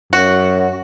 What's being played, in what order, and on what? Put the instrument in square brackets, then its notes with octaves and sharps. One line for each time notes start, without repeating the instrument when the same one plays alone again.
[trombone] F#2 [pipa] F#4